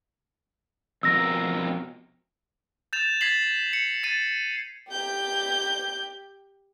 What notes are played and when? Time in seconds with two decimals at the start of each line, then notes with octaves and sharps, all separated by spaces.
1.03 F2 B2 A#4 E6 A#6
2.93 G6 A6 E7 F7
3.21 G#6 A6 B6 C7 F#7
3.73 C#7
4.04 A6 C7 D#7
4.91 G4 G6